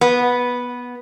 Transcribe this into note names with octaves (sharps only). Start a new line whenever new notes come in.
B3